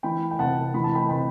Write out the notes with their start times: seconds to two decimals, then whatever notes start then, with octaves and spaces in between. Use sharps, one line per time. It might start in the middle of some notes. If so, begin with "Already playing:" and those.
0.03 E3 G5 B5
0.31 G5
0.39 C3 F#5 A5
0.74 E3 B5
0.84 A5
0.95 G5 B5
1.09 C3 G5 B5